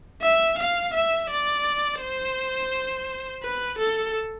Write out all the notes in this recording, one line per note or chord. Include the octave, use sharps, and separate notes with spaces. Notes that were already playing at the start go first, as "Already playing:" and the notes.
E5
F5
E5
D5
C5
B4
A4